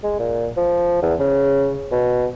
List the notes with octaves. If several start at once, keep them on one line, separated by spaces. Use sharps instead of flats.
G#3
A#2
F3
E2
C#3
B2